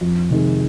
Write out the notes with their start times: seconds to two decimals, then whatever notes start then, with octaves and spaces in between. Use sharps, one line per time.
0.01 F2
0.31 C3 D#3 G#3